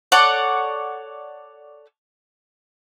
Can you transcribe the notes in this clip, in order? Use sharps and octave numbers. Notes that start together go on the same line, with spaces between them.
A4 C#5 D5 F#5